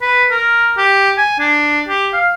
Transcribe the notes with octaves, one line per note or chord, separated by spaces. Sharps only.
B4
A#4
G4
G#5
D4
G4
F5